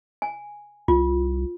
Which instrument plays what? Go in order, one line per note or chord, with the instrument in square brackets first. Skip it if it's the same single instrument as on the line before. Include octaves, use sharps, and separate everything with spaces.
[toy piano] G#5
[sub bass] C2 [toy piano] F4